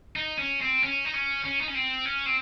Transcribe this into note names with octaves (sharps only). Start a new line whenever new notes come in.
D#4
C#4
C4
C#4
D#4
C#4
C#4
D#4
C#4
C4
C#4
C4